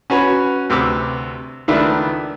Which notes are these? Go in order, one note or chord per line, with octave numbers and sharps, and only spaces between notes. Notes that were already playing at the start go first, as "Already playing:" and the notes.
C#4 F#4 B4 C#5
D2 C3 B4 D6 E6
C#2 D#3 A3 D4 B4 E5